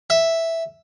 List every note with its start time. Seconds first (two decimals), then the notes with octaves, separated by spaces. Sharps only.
0.10 E5